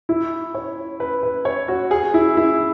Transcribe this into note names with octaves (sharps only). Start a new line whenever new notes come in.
E4
C#5
B4
B4
C#5
F#4
G#4
E4
E4